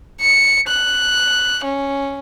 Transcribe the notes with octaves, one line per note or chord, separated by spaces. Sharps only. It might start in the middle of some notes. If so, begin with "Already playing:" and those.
C#7
F#6
C#4